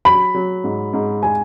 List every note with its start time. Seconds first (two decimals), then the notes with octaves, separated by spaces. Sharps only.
0.05 F#3 B5
0.34 F#3
0.64 G#2
0.93 G#2
1.23 G#5